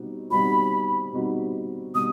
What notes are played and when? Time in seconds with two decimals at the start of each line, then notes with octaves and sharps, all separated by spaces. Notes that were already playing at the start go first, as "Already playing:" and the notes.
Already playing: B2 G3 C4 D#4 F#4
0.30 B2 G3 C4 D#4 F#4 B5
1.12 B2 G3 C4 D#4 F#4
1.94 B2 G3 C4 D#6